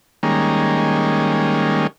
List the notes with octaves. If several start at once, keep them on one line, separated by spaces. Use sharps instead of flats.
D#3 G3 G#3 A#3 C#4